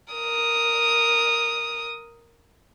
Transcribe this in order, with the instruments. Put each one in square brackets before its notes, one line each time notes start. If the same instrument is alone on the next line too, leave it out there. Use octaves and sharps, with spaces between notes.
[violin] A#4 D#6